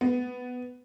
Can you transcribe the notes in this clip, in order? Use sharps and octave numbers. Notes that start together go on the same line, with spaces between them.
B3